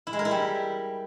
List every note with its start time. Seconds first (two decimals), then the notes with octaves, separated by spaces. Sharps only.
0.07 E4
0.13 G#3
0.19 A#4
0.25 E4
0.31 G3